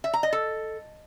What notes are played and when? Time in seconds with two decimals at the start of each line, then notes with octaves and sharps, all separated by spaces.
0.04 E5
0.13 A#5
0.23 D#5
0.33 A4